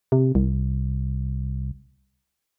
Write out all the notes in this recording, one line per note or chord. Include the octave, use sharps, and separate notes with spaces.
C3
C2